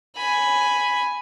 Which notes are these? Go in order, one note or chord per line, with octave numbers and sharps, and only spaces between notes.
G#5 B5